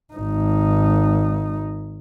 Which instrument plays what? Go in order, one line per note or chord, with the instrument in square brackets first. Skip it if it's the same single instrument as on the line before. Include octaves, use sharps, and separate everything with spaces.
[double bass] G#1 D#4